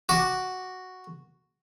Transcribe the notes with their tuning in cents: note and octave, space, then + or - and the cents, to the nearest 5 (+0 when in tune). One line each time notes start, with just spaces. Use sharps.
F#4 +0 D6 +0